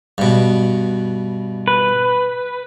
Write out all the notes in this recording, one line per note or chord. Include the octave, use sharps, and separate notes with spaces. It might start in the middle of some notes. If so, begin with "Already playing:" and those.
G2 B2
B4